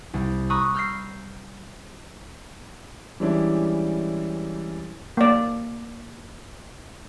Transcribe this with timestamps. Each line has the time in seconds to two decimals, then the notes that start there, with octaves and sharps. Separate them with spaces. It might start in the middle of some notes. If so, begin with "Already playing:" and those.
0.14 C2
0.50 A#5 B5 C#6 D#6 E6 F#6
0.74 E6 F6 G6 A#6 C7
3.20 E3 G3 G#3 C#4 D4 E4
5.17 A#3 D5